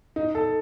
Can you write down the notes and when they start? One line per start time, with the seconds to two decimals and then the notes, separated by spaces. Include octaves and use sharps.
0.16 D#4
0.35 A4